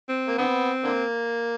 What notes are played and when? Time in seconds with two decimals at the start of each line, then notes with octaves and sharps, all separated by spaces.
0.09 C4
0.28 A#3
0.38 D3 B3 C4
0.84 D3 A#3